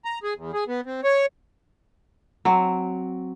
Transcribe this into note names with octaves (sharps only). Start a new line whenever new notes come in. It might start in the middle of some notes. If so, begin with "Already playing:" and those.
A#5
G#4
E2
G#4
B3
C4
C#5
F#3 C4